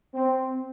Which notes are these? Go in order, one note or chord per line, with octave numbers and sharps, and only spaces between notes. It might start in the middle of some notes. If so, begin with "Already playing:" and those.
C4